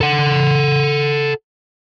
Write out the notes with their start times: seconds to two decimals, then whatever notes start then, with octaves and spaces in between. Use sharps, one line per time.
0.01 A4 F#5